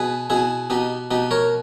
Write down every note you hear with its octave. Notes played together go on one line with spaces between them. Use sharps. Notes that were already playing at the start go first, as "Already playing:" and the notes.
Already playing: B2 G#4 B4
B2 E4 G#4
B2 D#4 G4
B2 D#4 G4
A#4 C#5